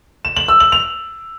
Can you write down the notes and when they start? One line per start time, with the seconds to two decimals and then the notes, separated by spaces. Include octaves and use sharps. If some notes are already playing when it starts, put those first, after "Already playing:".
0.25 E7
0.37 F#7
0.48 E6
0.60 F#7
0.72 F7